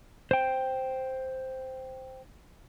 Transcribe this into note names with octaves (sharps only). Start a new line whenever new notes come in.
C5 G5